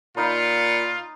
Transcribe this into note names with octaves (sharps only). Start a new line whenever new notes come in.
A#2 D#4 F4 B5